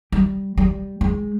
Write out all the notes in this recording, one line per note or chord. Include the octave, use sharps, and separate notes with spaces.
G3
G3
G#3